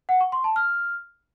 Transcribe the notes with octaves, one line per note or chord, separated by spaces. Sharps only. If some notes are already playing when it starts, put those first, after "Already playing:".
F#5
C#6
C6
A5
F6